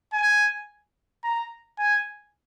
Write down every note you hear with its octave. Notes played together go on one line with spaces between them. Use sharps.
G#5
A#5
G#5